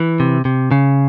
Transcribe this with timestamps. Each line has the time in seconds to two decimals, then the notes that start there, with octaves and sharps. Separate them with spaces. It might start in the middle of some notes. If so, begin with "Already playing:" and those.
Already playing: E3
0.20 C3
0.45 C3
0.71 C#3